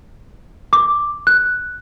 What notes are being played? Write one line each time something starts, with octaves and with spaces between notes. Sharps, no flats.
D6
F#6